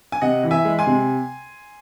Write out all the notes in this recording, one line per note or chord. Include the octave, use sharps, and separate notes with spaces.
G#5
C3 D#5 F#5
E3
E5 G#5
G#3
G#5 C6
C3